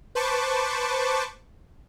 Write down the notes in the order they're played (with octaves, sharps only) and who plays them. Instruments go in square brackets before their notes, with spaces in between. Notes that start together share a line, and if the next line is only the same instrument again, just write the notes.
[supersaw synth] B4 C5 A5 C#6 D6